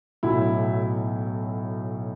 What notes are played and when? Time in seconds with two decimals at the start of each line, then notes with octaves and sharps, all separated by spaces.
0.23 B1 A2 F#3 E4